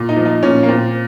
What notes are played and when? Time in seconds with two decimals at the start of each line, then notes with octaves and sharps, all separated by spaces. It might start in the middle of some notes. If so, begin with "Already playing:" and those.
Already playing: A#2
0.09 D#4
0.17 F3
0.25 D#4
0.43 A#2 C#4
0.63 A#3
0.68 A#2 C4